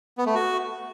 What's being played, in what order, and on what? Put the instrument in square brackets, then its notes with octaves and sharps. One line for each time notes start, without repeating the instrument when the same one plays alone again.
[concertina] B3
A3
F#4